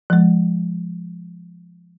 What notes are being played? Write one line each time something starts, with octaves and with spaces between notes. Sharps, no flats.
F3 G#3